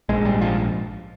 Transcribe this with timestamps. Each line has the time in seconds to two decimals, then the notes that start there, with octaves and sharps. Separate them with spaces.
0.09 A#1 G#2 G#3
0.25 G3
0.41 F3